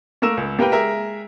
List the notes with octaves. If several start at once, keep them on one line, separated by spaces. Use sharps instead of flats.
A3 A#3 A#4 E6 E7
C#2
A#3 G4 A#4 B4 G5
G#3 A#4 E5